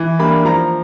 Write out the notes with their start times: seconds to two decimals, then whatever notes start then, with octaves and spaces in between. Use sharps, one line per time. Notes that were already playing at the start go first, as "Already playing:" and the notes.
Already playing: E3
0.19 G3 A#3 D4 B5
0.45 F3 A#5